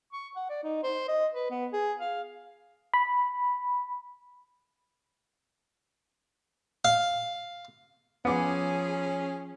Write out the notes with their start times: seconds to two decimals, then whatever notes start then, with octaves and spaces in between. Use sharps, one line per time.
0.13 C#6
0.36 F#5
0.49 D5
0.63 D#4
0.83 C5
1.08 D#5
1.34 B4
1.50 B3
1.73 G#4
2.00 F5
2.94 B5
6.85 F5
8.25 F3 B3 C#4 G#4 D6